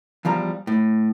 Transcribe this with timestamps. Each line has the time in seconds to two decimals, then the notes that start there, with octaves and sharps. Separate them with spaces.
0.25 E2 F3 G3 A#5
0.67 A2